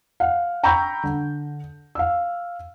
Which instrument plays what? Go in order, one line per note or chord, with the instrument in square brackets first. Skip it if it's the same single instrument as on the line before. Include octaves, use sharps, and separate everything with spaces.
[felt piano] F5 F#5
G5 A#5 B5 C#6 E6 G6
D3
F5 E6